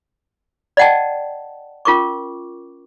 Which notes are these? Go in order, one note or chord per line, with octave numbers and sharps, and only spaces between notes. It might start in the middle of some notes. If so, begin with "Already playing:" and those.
D5 D#5 F#5 G5 A5
C#4 F4 A#4 C#6 D6